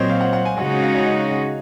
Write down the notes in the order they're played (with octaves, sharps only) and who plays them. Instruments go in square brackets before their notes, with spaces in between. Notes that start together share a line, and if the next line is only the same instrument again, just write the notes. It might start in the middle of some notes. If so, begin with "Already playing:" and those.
Already playing: [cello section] A#2 F#3 C4 [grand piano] C5 C#5 D#5
[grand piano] F5
F#5
F#5
G#5
[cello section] C#3 G#3 D#4 F#4 [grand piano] F#5
[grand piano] F5
C#5
D#5
D#5